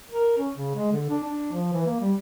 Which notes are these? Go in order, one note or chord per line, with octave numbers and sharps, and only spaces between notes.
A#4
C#4
C#3
G#3
D3
D4
D4
F3
E3
A#3
G3